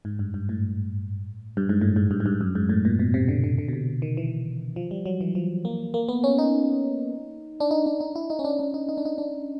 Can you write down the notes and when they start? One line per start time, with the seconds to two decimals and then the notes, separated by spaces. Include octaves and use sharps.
0.05 G#2
0.19 G2
0.34 G2
0.49 A2
1.57 G2
1.69 G#2
1.81 A2
1.96 G#2
2.11 G2
2.20 G#2
2.26 G2
2.41 F#2
2.55 G#2
2.69 A2
2.85 A#2
2.99 B2
3.14 C3
3.28 D3
3.44 D3
3.58 D3
3.68 B2
3.73 C3
4.02 D#3
4.17 E3
4.76 F3
4.91 G3
5.06 F#3
5.21 E3
5.35 F3
5.65 A#3
5.94 A#3
6.09 B3
6.24 C#4
6.38 D#4
7.60 D4
7.71 D#4
7.86 D4
8.00 D#4
8.16 E4
8.30 D#4
8.39 C#4
8.44 D4
8.59 D4
8.74 D#4
8.89 D#4
8.97 D4
9.05 D#4
9.18 D4